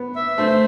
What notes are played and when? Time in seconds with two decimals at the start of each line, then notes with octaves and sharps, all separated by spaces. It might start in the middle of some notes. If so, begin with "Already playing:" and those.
Already playing: B3
0.16 E5
0.38 A3 C5